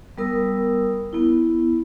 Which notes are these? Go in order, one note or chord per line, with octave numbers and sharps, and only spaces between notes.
G3 B3 A#4 D#6 E6
B3 E4